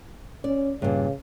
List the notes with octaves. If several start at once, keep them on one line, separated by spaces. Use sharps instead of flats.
C#4 D5
G2 A#2 C#3